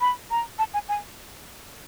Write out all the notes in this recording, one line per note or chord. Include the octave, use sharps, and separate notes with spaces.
B5
A#5
A5
G#5
G#5